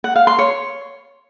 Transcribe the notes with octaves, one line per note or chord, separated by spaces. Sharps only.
F#5
F5
C6
C#5